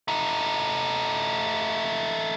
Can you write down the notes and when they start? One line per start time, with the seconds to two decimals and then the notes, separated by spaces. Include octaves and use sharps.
0.08 A3 D#4